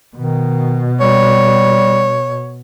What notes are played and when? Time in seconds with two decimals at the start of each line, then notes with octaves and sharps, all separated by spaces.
0.16 B2 D#3
1.00 G3 C#5